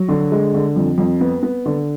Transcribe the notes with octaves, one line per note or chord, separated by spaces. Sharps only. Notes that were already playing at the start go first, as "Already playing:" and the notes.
Already playing: F#3
D3
G#3
D3
F2
F2
B3
B3
D3